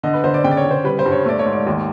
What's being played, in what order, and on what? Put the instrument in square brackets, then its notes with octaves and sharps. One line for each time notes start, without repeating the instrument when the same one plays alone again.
[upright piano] D3 D#5
B4
D3 C5
D5
C#3 G5
D5
C#5
C#3
C5
G3 B4
C5
G2
C#5
A3 D5
C#5
G#2
D5
D#2